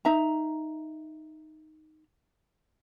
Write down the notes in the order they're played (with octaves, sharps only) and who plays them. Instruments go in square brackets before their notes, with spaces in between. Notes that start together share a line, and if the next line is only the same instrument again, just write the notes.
[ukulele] D#4 E5 A#5